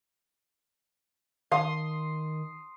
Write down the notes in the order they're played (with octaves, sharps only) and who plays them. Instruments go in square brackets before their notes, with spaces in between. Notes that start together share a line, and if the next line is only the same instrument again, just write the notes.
[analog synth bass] D#3 [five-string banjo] F5 [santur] C6 D#6